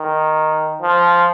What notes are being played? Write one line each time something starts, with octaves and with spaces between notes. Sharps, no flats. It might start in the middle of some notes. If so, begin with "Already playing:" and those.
Already playing: D#3
F3